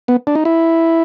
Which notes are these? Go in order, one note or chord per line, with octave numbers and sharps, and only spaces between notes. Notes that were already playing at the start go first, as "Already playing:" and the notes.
B3
D4
D#4
E4